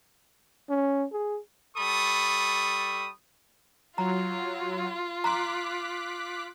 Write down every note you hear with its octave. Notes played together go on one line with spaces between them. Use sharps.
C#4
G#4
G3 A4 B5 C#6 D#6
F#3 F4 A#5
A#5 C6 D6 F#6 B6